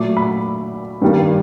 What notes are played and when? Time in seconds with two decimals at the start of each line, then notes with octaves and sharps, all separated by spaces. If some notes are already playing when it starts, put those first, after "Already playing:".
Already playing: A#2 F#3 A3 D6
0.17 B5
1.02 G2 D#3 G3 A#3